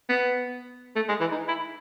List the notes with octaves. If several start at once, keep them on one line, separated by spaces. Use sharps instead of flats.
B3
A3
G#3
E3
D#4
E4